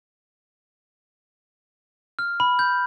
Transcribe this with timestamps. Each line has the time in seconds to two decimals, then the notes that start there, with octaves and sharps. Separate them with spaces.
2.19 F6
2.40 B5
2.59 G6